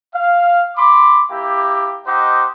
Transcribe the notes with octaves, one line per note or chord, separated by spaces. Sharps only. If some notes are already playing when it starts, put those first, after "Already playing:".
F5
B5 C6 D6
A#3 E4 G4
D#4 G4 C5 D#5 F#5